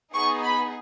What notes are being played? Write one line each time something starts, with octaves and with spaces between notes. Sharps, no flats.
B3 D#4 G#4 C#6
B5